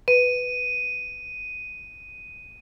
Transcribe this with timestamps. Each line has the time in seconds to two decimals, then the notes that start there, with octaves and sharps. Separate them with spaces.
0.08 B4 D#7